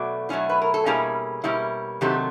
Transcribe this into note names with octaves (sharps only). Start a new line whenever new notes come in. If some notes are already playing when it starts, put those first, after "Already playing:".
Already playing: B2 F#3 A3 D5
B2 F#3 A3 C#4 E4
B4
A#4
A4
B2 G3 A#3 C#4 E4 G#4
B2 G3 A#3 C#4 E4
C3 D#3 F#3 A3 C4 G4